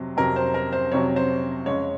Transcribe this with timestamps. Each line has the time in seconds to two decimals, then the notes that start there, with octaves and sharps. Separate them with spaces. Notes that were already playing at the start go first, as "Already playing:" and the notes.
Already playing: F2 C3 F#3
0.17 F2 C3 F#3 A#4
0.36 C5
0.54 A#4
0.72 C5
0.91 F2 C3 F#3 C#5
1.16 C5
1.66 F2 C#3 G#3 C#5